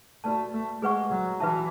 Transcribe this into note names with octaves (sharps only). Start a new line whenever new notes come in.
A3 F#4 B4 D5 A5
A3
G#3 G#4 B4 F#5 C#6
F#3
E3 F#4 B4 E5 A5